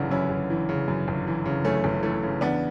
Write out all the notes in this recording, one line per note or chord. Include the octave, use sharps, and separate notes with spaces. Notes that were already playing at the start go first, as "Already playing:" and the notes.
Already playing: G1 F#2 C#3 E3 D4 F#4
F#2 C#4 E4
G1
E3
C#3
F#2
G1
E3
C#3
F#2 A3 C#4
G1
E3 A3 C#4
C#3
E2 B3 D4